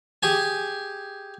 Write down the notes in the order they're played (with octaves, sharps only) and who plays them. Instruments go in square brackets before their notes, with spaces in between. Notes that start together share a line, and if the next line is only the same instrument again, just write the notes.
[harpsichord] G4 G#4 G#5